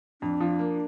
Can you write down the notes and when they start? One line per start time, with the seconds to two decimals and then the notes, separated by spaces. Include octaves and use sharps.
0.22 F2 D4
0.40 F3
0.59 A#3